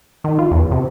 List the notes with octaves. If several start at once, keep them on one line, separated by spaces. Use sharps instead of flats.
D#3
F4
E2
C3